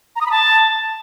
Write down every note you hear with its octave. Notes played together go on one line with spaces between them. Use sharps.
A#5
D#6
B5
A5